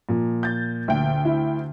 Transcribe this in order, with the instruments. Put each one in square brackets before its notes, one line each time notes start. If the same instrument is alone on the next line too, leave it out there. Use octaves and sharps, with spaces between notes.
[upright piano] A#2 F3
[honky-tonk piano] G6 A6
[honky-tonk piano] D2 G5 [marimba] D3
[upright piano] E4